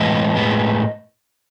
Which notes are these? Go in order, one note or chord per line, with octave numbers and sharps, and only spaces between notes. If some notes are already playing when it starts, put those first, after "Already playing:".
Already playing: A2 E3 G#3 B3 B4 D#5
A2 G#3 B3